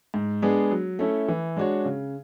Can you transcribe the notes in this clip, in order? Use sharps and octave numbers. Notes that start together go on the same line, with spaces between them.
G#2
G#3 B3 D4 G#4
F#3
A3 C#4 E4 A4
E3
G#3 D4 F#4 C#5
C#3